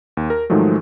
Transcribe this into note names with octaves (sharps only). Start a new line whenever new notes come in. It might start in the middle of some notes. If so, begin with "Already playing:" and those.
D#2
A#4
G#2 D#3 F3 F#3 G#3 A3